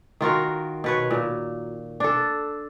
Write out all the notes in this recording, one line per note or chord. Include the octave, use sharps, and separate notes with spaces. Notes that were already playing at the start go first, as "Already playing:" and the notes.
D#3 F4 F#4 A#4
B2 B4 C#5
A#2
D4 A4